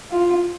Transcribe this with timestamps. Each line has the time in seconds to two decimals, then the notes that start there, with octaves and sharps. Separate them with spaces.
0.11 F4